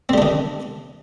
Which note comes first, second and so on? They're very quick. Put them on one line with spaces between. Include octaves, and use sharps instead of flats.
C4 G3 D4 D#3